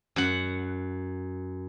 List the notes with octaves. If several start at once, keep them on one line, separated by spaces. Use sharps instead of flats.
F#2 F#5